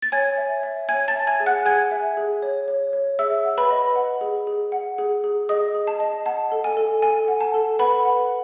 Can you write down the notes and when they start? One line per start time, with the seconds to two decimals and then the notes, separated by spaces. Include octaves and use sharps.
0.02 A6
0.12 C#5 G#5 G#6
0.38 E5
0.63 E5
0.89 C#5 G#5 G#6
1.08 A5 A6
1.15 E5
1.27 G#5 G#6
1.40 G#4
1.46 F#5 F#6
1.65 G#4 G#5 G#6
1.91 E5
2.17 G#4
2.42 C#5
2.68 C#5
2.93 C#5
3.19 G#4 E5 E6
3.45 F#5
3.58 B4 B5
3.71 D#5
3.96 F#5
4.21 G#4
4.47 G#4
4.72 F#5
4.98 G#4
5.24 G#4
5.49 G#4 D#5 D#6
5.74 G#4
5.87 A5
6.00 D#5
6.26 F#5 A5
6.52 A4
6.64 G#5
6.77 A4
7.02 A4 G#5
7.28 F#5
7.41 A5
7.54 A4
7.79 B4 F#5 B5
8.05 F#5